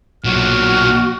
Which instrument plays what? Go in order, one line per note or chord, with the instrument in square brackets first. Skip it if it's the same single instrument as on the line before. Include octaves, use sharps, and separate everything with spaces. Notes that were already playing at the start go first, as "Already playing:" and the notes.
[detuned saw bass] B1 [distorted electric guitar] A#2 F#3 [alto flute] F#4 [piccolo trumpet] F6